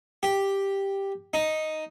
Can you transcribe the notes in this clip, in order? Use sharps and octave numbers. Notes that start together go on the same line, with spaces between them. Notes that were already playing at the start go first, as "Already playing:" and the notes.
G4
D#4